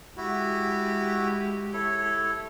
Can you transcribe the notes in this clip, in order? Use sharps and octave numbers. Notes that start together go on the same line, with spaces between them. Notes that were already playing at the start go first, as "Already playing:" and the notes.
G#3 E4 F#4 G4
E4 A4 C#5